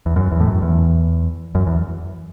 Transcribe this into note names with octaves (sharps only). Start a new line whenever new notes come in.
E2
F#2
E2
A2
F#2
E2
F#2
E2